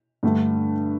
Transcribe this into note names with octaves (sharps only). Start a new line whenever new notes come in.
G2 D3 A3